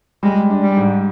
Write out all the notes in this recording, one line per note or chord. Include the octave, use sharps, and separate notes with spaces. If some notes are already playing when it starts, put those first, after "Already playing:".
G3 G#3
D4
G3
G#2